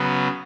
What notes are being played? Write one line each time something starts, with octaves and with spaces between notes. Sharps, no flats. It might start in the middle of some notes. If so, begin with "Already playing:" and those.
Already playing: C#3 F#3 B3